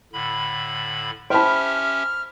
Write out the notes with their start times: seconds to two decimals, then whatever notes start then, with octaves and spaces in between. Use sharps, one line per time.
0.13 A2 D3 B5
1.30 C#4 G4 C5 E5 G5 A5 B5 F6